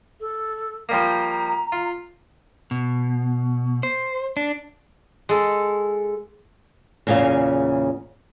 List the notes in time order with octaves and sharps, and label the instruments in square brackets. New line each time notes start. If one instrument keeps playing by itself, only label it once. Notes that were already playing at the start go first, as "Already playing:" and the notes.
[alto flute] A4
[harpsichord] F3 G3 A#3 [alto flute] A#5
[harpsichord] F4
[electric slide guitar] B2
C5
D4
[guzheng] G#3 A4
[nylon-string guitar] E2 A#2 C#3 C#4 F5